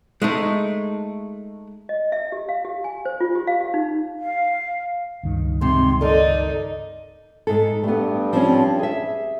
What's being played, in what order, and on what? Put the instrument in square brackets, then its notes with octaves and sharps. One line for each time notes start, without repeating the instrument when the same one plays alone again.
[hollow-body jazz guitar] G#3 A3 D#4
[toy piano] D#5
E5
G4
F5
G4
G#5
C5
F4
G4
F5
G4
D#4
[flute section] F5
[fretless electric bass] C#2 G2 D#3
[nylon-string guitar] G#2 C3 [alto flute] C6
[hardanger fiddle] D#4 [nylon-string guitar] A4 A#4 [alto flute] D5
[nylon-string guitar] G#2 A4
[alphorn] G2 [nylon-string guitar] A3 B3
[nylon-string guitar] F3 C4 C#4
G#4 E5